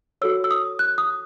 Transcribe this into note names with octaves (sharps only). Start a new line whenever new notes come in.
F#4 A4 C#5 E6
E6
D#6
F#6
D#6